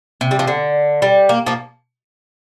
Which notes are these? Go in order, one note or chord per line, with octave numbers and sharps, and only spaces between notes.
C3
G3
F3
D3
G3
A#3
F3 A#3